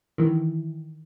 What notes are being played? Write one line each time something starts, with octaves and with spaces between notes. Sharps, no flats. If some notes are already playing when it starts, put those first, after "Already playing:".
D#3 E3